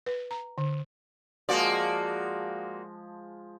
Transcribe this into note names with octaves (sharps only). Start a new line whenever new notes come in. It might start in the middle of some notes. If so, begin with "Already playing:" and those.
B4
A#5
D3
F3 G#3 A#3 F#4 D5